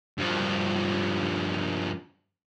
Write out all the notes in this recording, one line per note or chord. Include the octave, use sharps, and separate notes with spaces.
G2 F3